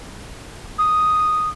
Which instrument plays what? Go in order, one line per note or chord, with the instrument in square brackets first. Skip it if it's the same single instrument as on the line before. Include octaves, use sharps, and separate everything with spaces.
[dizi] D#6